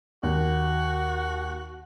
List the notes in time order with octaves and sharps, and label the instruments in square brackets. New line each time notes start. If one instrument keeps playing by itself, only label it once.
[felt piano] D#2 [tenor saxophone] F#4